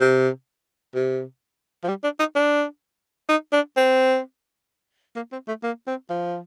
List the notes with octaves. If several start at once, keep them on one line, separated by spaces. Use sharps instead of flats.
C3
C3
F3
G3
D4
D#4
D4
D#4
D4
C4
A#3
C4
A3
A#3
C4
F3